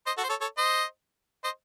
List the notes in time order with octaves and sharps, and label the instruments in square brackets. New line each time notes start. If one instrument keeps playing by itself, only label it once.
[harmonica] C5 D#5
F#4 A4
C5
A4 C#5
A4 C#5
C5 D#5
C5 D#5